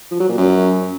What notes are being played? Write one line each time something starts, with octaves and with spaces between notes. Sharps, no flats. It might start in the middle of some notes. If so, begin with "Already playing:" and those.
F3
F#3
A#2
F#2